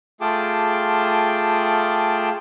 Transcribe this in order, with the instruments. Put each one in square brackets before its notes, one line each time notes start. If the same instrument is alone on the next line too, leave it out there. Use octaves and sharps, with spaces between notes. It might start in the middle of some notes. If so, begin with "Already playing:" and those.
[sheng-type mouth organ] A3 F4 G#4 G5 A5 D6